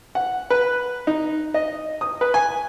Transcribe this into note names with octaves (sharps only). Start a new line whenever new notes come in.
F#5
B4
D#4
D#5
D#6
B4
G#5